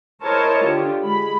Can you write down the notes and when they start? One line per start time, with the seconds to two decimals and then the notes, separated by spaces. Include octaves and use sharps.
0.21 E4 A#4 C5 C#5 D#5 A5
0.65 D3 F4 G4
1.02 G#3 B5